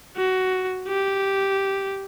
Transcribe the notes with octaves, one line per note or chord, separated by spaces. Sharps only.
F#4
G4